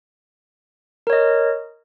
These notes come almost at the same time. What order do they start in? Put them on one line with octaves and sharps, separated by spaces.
A#4 C#5 D#5